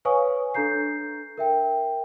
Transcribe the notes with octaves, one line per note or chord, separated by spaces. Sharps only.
B4 C#5 F5 G#5 C#6 D#6
D4 A4 A#5 G6 C7
A#4 E5 G5